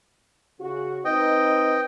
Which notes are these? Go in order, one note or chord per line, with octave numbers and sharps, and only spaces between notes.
C#3 F#4
C4 D#4 B4 D#5 G5